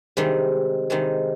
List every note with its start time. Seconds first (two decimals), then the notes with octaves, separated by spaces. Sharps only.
0.17 C3 D#3 G3 G#3
0.90 C3 D#3 G3 G#3